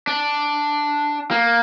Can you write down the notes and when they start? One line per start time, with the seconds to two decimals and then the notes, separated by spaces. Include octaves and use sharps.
0.07 D4
1.31 A#3